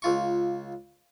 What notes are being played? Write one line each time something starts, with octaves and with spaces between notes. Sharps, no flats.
C#2 F4 C#6